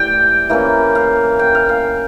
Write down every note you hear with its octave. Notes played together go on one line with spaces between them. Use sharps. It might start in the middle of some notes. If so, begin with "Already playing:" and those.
Already playing: A2 E3 G3 D5 G5
E3 A#3 C#4
F5
G5
F5
F5